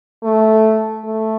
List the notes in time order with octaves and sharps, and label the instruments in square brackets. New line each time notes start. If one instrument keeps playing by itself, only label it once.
[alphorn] A3
A3